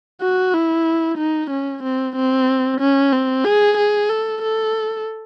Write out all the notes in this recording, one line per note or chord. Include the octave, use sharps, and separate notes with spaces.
F#4
E4
D#4
C#4
C4
C4
C#4
C4
G#4
G#4
A4
A4